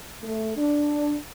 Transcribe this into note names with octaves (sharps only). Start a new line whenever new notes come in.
A3
D4